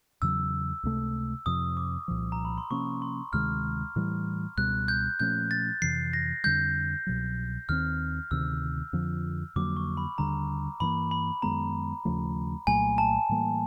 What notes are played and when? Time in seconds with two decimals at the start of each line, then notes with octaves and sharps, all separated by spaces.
0.22 E2 C#3 F#3 E6
0.83 C#2 C3 E3 A3
1.46 F2 C3 F3 D#6
1.77 D6
2.08 C2 A#2 F3
2.32 A#5
2.45 B5
2.58 C6
2.70 C3 F3 A#3 C#4 C#6
3.02 C6
3.33 D2 C3 D#3 G#3 F6
3.96 A2 E3 G3
4.57 C#2 B2 G3 F#6
4.88 G6
5.20 A#2 F3 A3 C#4 G6
5.51 A6
5.82 F2 C3 E3 C7
6.13 A#6
6.44 F2 D3 G3 G6
7.07 C2 B2 F#3
7.69 D#2 D#3 G3 C4 F6
8.31 D2 C3 D#3 E6
8.93 F2 D3 F3
9.56 F2 D3 F#3 A#3 D6
9.77 C#6
9.97 B5
10.18 D#2 D3 G3 A#5
10.80 G2 E3 G3 A#3 B5
11.11 B5
11.42 F#2 D#3 G#3 B3 A#5
12.05 D#2 C#3 F3 A3
12.67 C2 A#2 F#3 A3 G#5
12.98 A5
13.29 A2 E3 G3 A#3